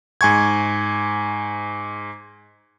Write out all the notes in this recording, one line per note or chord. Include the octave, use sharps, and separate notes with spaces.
G#2 G#5 C#6 G#6